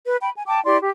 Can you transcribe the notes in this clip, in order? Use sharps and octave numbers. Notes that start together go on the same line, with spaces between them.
B4
G5 B5
G#5
G5 A5 D6
E4 G4 D5 C6
G4